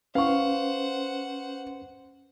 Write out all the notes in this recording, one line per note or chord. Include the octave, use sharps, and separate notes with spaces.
C#4 B4 C5 F5 F#5 C#6